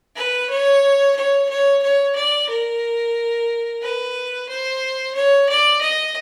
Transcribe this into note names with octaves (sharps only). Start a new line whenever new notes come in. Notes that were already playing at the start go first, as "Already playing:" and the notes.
B4
C#5
C#5
C#5
C#5
D5
A#4
B4
C5
C#5
D5
D#5